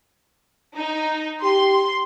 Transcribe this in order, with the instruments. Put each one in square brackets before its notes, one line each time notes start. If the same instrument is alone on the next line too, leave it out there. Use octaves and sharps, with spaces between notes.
[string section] D#4
[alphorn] G4 [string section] C6